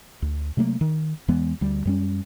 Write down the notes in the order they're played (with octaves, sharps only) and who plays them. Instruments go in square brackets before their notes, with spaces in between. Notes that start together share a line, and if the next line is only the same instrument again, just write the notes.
[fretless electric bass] D2
C3 F#3 A3 A#3
D#3
E2 E3 G#3 B3
D2 G3
F#2 G3 C#4